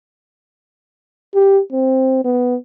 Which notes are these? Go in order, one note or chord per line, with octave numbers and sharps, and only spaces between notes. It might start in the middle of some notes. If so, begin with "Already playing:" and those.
G4
C4
B3